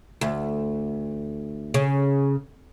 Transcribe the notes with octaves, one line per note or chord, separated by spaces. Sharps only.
D2
C#3